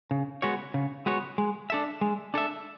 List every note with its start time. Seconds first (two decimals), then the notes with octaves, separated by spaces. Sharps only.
0.11 C#3
0.42 G#3 B3 F#4 C#5
0.74 C#3
1.06 G#3 B3 F#4 C#5
1.38 G#3
1.70 D4 A4 E5
2.01 G#3
2.34 D4 A4 E5